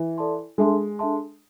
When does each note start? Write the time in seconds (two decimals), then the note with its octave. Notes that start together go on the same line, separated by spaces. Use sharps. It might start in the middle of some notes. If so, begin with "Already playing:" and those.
Already playing: E3
0.18 A4 D5 A5 C6
0.58 G#3 D4 A4 E5 A5 C6
0.99 D4 A4 E5 A5 C6